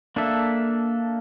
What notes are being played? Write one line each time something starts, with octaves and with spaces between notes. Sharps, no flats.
A#3 D4 A4 E5